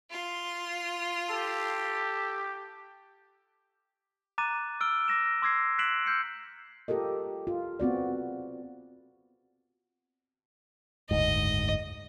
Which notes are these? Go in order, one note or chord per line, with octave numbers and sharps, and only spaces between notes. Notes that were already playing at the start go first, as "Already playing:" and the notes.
F4 C6
G4 A4
A#5 D6 F#6 A6 D#7
E6 F6 D7 G7
D6 A#6 E7
C6 D6 E6 G#6 A#6 C7
F#6 B6 C7 D7 E7 F#7
E6 F6 G6 C7 C#7
F4 G4 A4 A#4 D#5
F4
B3 C4 F#4 D5
F#1 D2 G#2 D#5